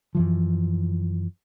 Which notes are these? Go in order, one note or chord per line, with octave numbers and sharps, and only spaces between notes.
F#2 E3 F3